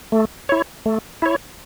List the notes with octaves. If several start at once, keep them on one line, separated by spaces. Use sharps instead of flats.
A3
E4 C#5
A3
E4 C#5